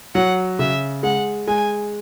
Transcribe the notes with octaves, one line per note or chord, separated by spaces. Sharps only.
F#3 F#5
C#3 E5
G#3 F#5
G#3 G#5